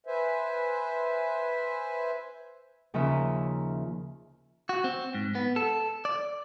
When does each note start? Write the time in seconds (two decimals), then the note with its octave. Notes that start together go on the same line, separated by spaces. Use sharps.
0.07 B4 C5 E5 G#5
2.94 D#2 C#3 F3 C#4 A#4 E5
4.69 F#4
4.84 C4
5.15 G#2
5.35 B3
5.56 A4
6.05 D5